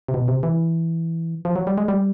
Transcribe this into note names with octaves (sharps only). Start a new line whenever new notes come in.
C3
B2
C3
E3
F3
F#3
G3
G#3
G3